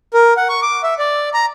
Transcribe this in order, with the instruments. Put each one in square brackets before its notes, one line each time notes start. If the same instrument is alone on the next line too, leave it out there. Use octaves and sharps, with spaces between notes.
[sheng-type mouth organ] A#4
F#5
C#6
D6
E5
D5
A#5